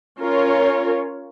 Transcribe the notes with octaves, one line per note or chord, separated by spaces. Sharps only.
C#4 F4 A#4 C#5